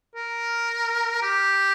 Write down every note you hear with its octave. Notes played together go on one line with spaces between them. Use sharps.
A#4
G4